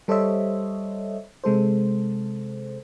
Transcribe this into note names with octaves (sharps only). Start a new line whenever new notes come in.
G3 A4 C5 C#5 D#5 E5
C3 G#3 A4 C5